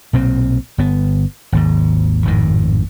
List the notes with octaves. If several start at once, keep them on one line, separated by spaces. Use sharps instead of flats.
B1 A#2 C4
G1 B3
G#1 D#2 G#2
G#1 F2 A2 D#3